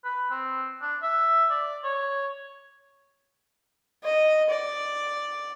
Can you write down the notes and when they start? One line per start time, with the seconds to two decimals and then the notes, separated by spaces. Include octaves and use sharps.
0.04 B4
0.30 C4
0.81 D4
1.03 E5
1.50 D5
1.84 C#5
4.04 D#5
4.49 D5